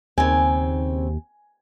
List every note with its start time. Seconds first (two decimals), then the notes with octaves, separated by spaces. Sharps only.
0.18 D#2 C#3 C4 G#5